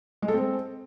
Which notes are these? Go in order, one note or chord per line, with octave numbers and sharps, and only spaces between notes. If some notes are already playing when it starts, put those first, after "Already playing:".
G#3
A4
C4